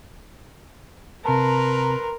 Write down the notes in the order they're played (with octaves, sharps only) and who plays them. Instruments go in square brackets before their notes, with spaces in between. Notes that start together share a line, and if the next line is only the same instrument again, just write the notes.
[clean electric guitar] C3 A5 [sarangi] A#4 [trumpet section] B4 A#5 C6